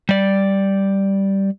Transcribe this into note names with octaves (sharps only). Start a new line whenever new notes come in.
G3 D5